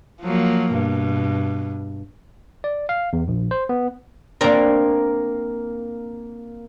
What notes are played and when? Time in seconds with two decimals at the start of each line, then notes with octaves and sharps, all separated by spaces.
0.21 F3 F#3 A#3
0.72 G2 B2
2.64 D5
2.89 F5
3.13 E2
3.28 A#1
3.51 C5
3.69 B3
4.41 A#3 C4 D4 A#4 A#5